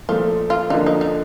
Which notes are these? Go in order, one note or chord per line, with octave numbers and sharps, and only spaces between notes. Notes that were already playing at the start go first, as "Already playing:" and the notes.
A#2 F3 A3 F4
F4
D3 F3 A#3 D#4
D#4
D#4